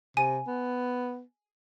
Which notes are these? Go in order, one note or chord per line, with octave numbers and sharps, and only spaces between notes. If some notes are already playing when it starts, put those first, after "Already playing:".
C3 G#5 D#7
B3